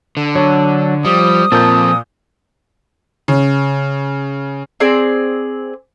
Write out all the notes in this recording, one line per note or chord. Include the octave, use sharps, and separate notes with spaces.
D3
F#3 D4 C#5
F3 G3 D#6
A#2 F3 C4 A#4 A5 G6
C#3
C4 G#4 D5